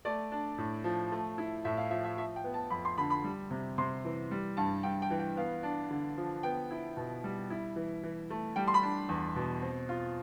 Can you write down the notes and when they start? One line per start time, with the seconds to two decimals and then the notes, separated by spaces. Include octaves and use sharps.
0.05 A3 D5
0.32 D4
0.58 A2
0.84 F3
1.12 A3
1.38 E4
1.65 A2 E5
1.77 F5
1.91 F3 E5
2.04 E5
2.17 F3 E5
2.36 G5
2.44 B3
2.54 A5
2.70 F2 B5
2.85 C6
2.98 D3 B5
3.10 B5
3.24 G3
3.51 C3
3.78 C3 C6
4.05 E3
4.31 G3
4.57 G2 A5
4.83 G2 G5
5.02 G5
5.10 E3
5.19 G5
5.37 B3 F5
5.63 D4
5.91 D3
6.17 F3
6.43 B3 G5
6.71 E4
6.97 B2
7.24 G3
7.50 E4
7.76 E3
8.03 E3
8.30 A3
8.56 G3 G5
8.68 C6
8.74 B5
8.83 D4
9.09 E2
9.36 B2
9.62 C4
9.89 F4